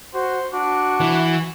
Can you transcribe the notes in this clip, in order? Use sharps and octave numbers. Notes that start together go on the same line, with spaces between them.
F#4 C5
D4 F#4
E3